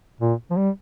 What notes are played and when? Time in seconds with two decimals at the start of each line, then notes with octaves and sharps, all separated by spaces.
0.20 A#2
0.51 F3
0.57 G3